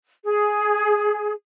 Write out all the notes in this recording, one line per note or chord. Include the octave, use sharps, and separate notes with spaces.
G#4